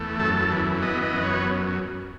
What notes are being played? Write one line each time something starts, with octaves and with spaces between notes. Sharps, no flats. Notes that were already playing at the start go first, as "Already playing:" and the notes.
Already playing: E2 A3
F#2 A4
E3
B3 D#5
D#5
F#2
C#5